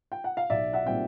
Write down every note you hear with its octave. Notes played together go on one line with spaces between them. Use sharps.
G5
F#5
F5
B1 D5 E5
E5 F#5
A#2 G3 C4 G5